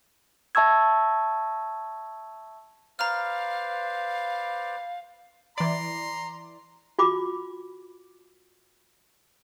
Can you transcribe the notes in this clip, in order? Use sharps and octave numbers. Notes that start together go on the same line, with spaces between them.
E5 A5 C#6 E6 G#6
B4 C5 D5 F5 A#5 F6
E3 D5 A#5 C6
F4 F#4 B5 D6